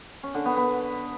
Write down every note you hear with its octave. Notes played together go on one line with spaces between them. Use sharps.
C#4
D3
B3
B3